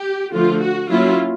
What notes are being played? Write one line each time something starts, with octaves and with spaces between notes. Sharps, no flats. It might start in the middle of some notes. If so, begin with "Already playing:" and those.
Already playing: G4
D3 F3 A3 F4
F#4
F#3 A#3 C#4 E4 F4